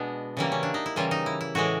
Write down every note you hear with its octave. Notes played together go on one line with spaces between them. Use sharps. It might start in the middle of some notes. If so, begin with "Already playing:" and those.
Already playing: B2 G#3 B3 D4
C#3 E3 G3 A#3 E4
C#4
D4
D#4
E4
C#3 E3 G3 A#3 F4
D#4
E4
E4
A2 E3 G#3 F#4